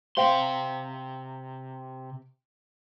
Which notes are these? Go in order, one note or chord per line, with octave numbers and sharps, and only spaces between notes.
C3 C5 F5 G5 C6